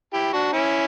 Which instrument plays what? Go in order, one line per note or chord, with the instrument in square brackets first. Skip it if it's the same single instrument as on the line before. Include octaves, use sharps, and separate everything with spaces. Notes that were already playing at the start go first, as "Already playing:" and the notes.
[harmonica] E4 G4
D4 F#4
C#4 E4